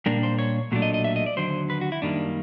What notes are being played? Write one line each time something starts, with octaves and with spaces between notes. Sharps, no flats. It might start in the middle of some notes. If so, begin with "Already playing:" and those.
A#2 G3 A#3 D4 A#4
C5
C#5
B1 A#2 F#3 A3 D4
D#5
D#5
E5
D#5
D5
D#2 D3 F#3 C5
B4
F#4
E4
F#2 D#3 G3 A#3 D4